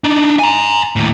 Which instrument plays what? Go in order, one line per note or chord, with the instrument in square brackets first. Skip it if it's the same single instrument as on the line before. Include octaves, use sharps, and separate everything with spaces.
[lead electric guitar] D4 D#4
G#5 A#5
D#2 A2